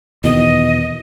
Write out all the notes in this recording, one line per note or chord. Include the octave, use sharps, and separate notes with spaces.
E2 B2 D#3 D#5